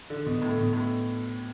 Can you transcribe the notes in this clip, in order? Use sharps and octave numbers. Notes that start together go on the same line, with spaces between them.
D3
B2
A2
B2
A2